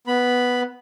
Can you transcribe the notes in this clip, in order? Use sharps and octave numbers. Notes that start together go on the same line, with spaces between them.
B3 B5